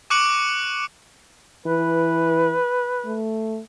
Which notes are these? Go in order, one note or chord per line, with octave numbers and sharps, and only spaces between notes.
C#6 D6 F#6 C#7 D7 F#7
E3 B4
A3